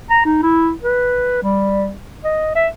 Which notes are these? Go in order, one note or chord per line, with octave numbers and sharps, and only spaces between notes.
A#5
D#4
E4
B4
G3
D#5
E5